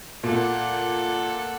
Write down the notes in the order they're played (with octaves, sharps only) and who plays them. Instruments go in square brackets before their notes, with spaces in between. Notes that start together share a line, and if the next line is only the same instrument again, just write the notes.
[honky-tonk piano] A#2 [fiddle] A4 F#5